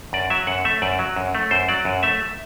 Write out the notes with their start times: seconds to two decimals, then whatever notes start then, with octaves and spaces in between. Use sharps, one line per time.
0.13 F#2 D5
0.30 F#3 E5
0.47 F#2 F#5
0.65 A3 E5
0.82 F#2 D5
0.99 F#3
1.16 F#2
1.35 A3
1.51 F#2 C5
1.69 F#3 D5
1.85 F#2
2.03 A3 E5